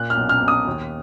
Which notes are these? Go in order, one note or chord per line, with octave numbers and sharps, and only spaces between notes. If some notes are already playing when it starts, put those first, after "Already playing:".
Already playing: A#2 F#6
F6
B1
F6
B1
D#6
D#2